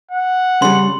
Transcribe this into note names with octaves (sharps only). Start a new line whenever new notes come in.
F#5
C#3 G3 C6